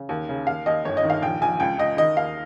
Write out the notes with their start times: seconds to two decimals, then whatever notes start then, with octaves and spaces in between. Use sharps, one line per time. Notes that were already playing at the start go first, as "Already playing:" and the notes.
Already playing: C#3
0.09 D#2
0.29 C#3
0.47 D#2 F5
0.66 D#2 D#5
0.85 G1 C#5
0.97 D#5
1.03 D#3
1.10 F5
1.22 A#1 G5
1.41 A#1 G#5
1.60 C#2 G5
1.78 C#2 D#5
1.97 D#3 D#5
2.16 D#2 F5